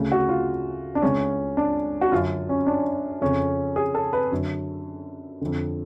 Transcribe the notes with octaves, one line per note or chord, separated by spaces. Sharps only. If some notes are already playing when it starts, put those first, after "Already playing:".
Already playing: D2 C#3
F#4
F4
D4
C#2 C#3 C#4
D4
F#4
F#2 D3 F4
C#4
D4
F2 C#3 C#4
G#4
A4
B4
F#2 D3
F2 D3